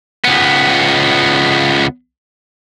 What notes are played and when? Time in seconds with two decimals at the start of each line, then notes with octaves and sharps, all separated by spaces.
0.25 C#2 B3